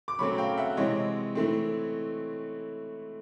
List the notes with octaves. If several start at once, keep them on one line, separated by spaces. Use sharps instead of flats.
D6
C#3 F#3 A3 C4 B5 C#6
F5 G5
E5 F#5
C3 E3 G#3 C4 C#5 D#5
E3 A3 C4